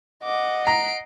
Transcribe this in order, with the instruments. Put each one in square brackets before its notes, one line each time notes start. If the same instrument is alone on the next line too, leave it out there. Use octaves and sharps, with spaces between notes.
[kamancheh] D#5 F#5 [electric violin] D6
[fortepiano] A#5 [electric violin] C7 D7